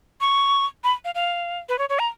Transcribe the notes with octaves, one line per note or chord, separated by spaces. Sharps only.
C#6
B5
F5
F5
B4
C#5
C#5
A#5